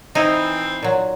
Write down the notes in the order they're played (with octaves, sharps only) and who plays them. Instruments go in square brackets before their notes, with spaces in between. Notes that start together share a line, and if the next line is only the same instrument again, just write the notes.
[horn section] E3 C4 [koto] D#4 E4
[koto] A#2 F#3